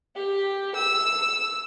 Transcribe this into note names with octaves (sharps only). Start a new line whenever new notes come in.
G4
E6